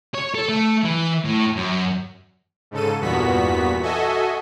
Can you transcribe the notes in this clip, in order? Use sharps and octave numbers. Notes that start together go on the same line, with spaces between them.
C#5
A4
A3
E3
A2
F#2
G#2 C#3 A4 D#7
E2 G2 A#2 B3 F#4 B6
F#4 A4 D#5 E5 G#5